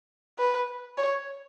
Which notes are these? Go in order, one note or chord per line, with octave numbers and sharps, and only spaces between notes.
B4
C#5